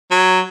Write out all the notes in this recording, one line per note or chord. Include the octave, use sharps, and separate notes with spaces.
F#3